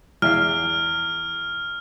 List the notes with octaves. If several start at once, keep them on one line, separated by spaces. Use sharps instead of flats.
E2 E5 F5 F6